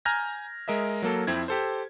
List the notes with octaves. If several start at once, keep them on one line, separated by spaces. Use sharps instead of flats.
G#5 A#5 F6 G6 G#6 A#6
G#3 A#4 D#5 E5
F#3 A#3 A4
F2 C4 E4 G#6
G4 A4 C5